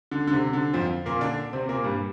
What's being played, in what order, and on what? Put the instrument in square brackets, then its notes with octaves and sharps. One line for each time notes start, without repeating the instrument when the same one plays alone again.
[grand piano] D3
D3
C3
D3
F2 F3
A#2 A#3
D3 D4
C3 C4
A#2 A#3
G2 G3